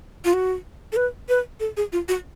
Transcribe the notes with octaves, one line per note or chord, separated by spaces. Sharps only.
F4
F#4
A4
B4
B4
A4
G#4
F4
F#4